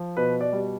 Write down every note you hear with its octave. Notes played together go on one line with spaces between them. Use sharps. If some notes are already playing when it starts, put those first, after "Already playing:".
Already playing: F3
B2 B4
D5
G3